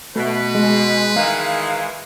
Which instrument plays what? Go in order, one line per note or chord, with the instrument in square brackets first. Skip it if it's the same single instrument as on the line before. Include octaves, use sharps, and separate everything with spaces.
[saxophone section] B2 [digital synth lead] A3 [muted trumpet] B4
[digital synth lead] G#3
[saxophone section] D#3 E3 G#3 [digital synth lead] F5